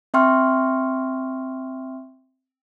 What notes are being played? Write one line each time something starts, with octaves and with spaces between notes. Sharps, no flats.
C4 E5 G5 C6 C#6 F6